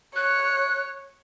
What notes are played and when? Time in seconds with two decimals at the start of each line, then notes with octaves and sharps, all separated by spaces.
0.16 C#5 F#6